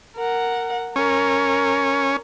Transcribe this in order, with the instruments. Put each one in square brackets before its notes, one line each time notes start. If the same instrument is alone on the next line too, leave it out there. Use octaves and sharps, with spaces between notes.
[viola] A#4 F#5
[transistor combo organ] C#4 [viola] A#4